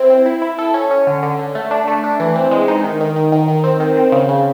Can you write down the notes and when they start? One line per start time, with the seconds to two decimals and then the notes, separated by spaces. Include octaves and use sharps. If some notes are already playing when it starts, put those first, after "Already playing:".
Already playing: C4 E4
0.10 C4
0.26 E4
0.42 E4
0.59 A4
0.74 C#4
0.91 C#4
1.07 D3
1.23 D3
1.39 D3
1.55 A3
1.71 D4
1.88 A3
2.04 D4
2.20 E3
2.36 C4
2.51 G#3
2.68 D#4
2.84 D#3
3.00 D#3
3.16 D#3
3.32 D#3
3.48 D#3
3.64 C4
3.80 D#3
3.97 C4
4.12 C#3
4.29 C#3